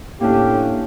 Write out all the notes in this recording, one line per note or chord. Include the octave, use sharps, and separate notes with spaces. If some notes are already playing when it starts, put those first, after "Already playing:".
A2 A#3 C#4 D4 G4